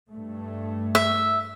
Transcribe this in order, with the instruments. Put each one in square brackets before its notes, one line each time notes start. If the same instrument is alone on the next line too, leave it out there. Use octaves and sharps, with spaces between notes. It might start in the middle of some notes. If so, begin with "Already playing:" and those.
[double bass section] G2 A3
[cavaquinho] E5